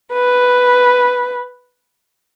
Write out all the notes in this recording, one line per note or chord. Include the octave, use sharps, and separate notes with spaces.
B4